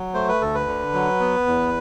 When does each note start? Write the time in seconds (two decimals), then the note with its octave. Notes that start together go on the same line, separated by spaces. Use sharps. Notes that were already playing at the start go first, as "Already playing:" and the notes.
Already playing: F#3
0.14 A3 C5
0.28 B4
0.41 D2 A4
0.55 B4
0.67 D3
0.94 F#3
1.20 B3
1.46 E2